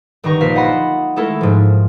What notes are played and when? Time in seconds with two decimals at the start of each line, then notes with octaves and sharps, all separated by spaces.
0.24 G1 D#3 D#4 A#5 C#6
0.41 A#1 C5 F5 B6
0.55 D#5 F#5 A5 B5 C6
1.16 G#3 A3 E4 A4 A#4
1.41 G#2 F3